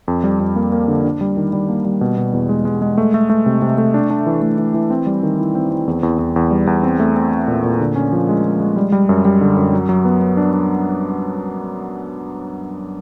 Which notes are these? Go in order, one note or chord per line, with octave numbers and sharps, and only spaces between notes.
F2
G3
F2
A#3
A#3
D3
D4
G3
D#3
G3
A#3
G3
B2
B2
E2
G#3
G#3
G#3
A3
A3
A3
C3
C3
A3
D4
D4
E3
A3
E3
E3
C4
G3
D#3
E4
C4
C4
E2
E2
E2
E2
G3
E2
C4
A3
C4
C4
A#2
A#2
D3
C#4
F3
G#3
F3
G#3
G3
G3
F#2
G3
D3
F#2
F#3
F#3
B3
B3
D4
D4